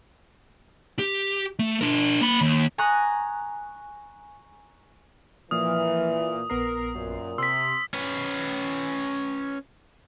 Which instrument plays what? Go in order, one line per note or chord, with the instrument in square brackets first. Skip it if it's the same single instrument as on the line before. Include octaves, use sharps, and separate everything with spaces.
[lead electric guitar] G4
A3
D4 A#4
A#3 B5
D#2
[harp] G#5 A#5 C#6 D#6 F#6 A#6
[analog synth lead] A#2 [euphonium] E3 [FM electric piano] F3 F6 [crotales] D#6
[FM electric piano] A#1 B3 C7 [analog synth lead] A#4
[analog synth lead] F#2 [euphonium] A#2
[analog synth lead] C3 [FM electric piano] C6 [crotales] E6 B6
[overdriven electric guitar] C#4 B4